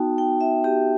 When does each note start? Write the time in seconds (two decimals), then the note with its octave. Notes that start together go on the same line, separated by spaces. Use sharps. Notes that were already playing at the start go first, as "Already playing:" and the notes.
Already playing: B3 D#4 F#4 G5 A5
0.18 G5
0.41 E5
0.64 G4